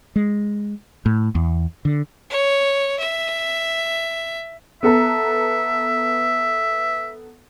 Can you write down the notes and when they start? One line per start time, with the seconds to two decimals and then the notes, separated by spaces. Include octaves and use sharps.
0.16 G#3
1.06 A2
1.35 E2
1.85 D3
2.30 C#5
2.99 E5
4.83 B3 A4 E5 A#5